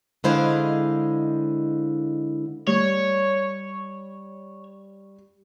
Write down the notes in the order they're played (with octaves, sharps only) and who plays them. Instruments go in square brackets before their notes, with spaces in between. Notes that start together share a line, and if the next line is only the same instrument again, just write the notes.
[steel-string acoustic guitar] D3 G#3 E4 C5 D#5 F5
[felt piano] G3 [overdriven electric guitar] C#5